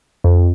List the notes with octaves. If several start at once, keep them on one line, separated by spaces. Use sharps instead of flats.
F2